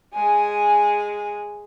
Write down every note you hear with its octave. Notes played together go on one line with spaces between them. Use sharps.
G#3 G#5